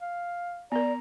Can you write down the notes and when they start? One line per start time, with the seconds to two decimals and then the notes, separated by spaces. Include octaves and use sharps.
0.01 F5
0.72 B3 A#4 D5 A#5